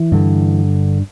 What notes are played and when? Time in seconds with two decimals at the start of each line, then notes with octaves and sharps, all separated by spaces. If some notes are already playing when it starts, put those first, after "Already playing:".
Already playing: E3
0.12 G2 D3